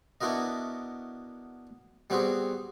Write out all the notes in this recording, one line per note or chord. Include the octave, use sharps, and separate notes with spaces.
B3 D4 E4 F#4 A#4 D#5
G3 B3 C4 F#4 G#4